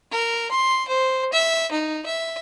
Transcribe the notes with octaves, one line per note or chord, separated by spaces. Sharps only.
A#4
C6
C5
E5
D#4
E5